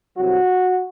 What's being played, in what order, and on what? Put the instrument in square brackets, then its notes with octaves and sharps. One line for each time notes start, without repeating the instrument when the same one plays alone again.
[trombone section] C2 C3 F#3 F#4